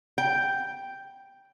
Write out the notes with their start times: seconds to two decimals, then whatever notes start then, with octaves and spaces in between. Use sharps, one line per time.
0.18 G5